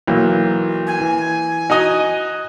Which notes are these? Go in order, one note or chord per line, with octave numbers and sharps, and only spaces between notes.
B1 E3 F#3 A#3
G#5
E3
D#4 F#4 D#5